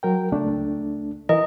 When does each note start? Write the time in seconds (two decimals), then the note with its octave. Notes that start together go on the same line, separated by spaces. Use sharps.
0.03 F#3 A#4 G5
0.32 C#2 A3 D4
1.29 E3 A#4 D#5